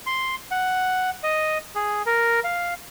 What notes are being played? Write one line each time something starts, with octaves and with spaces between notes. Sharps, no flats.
C6
F#5
D#5
G#4
A#4
F5